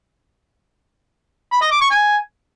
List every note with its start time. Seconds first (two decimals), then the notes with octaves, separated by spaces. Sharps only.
1.52 B5
1.62 D#5
1.71 D6
1.81 C#6
1.91 G#5